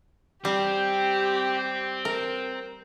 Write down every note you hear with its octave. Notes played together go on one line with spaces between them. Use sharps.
G3 C4 G4
A#4